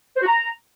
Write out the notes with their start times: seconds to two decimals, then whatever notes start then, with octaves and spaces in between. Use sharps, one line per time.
0.17 C5
0.22 F#4
0.27 A#5